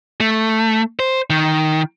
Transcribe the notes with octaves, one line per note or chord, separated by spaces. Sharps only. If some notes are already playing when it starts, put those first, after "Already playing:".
A3
C5
D#3